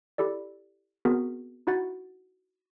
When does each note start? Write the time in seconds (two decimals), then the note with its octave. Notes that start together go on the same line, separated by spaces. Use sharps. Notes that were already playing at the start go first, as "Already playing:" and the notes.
0.18 E4 G4 A4 D5
1.05 B3 C4 F#4 G#4 A#4
1.67 D#4 E4 F#4 F#5 A6